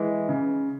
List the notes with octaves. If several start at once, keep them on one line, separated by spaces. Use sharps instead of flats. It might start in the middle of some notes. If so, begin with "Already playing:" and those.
Already playing: E3 G#3
C#3